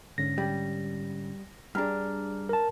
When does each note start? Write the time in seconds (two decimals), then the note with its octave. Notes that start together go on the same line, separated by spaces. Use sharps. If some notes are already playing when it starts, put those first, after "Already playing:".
0.18 G#2 D3 C#4 A#6
0.38 G3
1.75 G2 D4 G#4 A#5 F6
2.49 A#4 A5